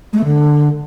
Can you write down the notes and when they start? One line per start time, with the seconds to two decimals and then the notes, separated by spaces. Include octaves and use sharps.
0.12 G#3
0.18 A3
0.24 D3